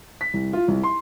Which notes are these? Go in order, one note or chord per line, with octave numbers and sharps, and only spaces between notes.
B6
C2
F4
C2
C6